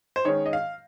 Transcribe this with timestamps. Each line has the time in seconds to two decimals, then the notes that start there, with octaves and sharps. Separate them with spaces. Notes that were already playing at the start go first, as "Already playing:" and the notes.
0.16 C5
0.25 D#3 G#3 C#4 C#5
0.46 D#5
0.53 F5